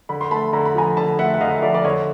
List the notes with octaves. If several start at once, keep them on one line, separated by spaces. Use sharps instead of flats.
D3 B5
C6
A3 A5 B5
D3 A#5
B5
F3 G#5 A#5
D3 A5 B5
A3 E5 F#5
F#5
D3 D#5 F5
F3 D5 E5
D5
D3 C#5 D#5